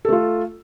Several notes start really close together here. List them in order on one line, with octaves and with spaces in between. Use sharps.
A4 A3 F4